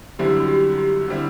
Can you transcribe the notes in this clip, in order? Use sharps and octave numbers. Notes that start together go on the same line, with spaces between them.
F#2 D3 G3 C4 E4 G4
F#4
G4
G4
D3 G3 C4 E4